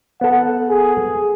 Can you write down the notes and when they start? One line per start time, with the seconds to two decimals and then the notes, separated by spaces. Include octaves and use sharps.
0.21 B3 A4 F#5
0.70 G#4